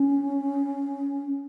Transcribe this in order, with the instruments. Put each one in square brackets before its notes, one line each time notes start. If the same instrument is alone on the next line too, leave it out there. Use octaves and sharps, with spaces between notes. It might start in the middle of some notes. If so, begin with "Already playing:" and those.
Already playing: [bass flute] C#4